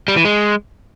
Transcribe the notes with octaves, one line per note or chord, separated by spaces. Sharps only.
G3
E3
G#3